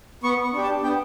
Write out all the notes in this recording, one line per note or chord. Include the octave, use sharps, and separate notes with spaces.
B3 C#6
C#6
D4 G4
A5
B3 G5